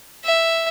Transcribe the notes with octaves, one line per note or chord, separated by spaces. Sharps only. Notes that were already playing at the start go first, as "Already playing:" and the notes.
E5